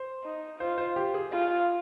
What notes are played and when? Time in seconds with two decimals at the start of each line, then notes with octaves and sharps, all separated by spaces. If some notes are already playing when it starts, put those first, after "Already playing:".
Already playing: C5
0.24 D#4
0.59 F4 C5
0.78 C5
0.96 G4
1.14 G#4
1.32 F4